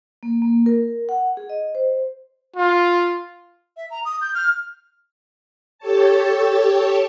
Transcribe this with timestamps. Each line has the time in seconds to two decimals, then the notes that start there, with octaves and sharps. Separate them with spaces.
0.23 A#3
0.42 A#3
0.66 A#4
1.09 F#5
1.37 G#4
1.50 D#5
1.75 C5
2.56 F4
3.77 E5
3.91 A#5
4.05 D#6
4.21 G6
4.35 F6
5.79 G4 A4 C#5 A5